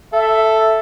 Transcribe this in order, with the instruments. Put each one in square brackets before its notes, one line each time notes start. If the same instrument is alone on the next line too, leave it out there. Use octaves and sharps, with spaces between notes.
[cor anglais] A4 [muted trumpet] E5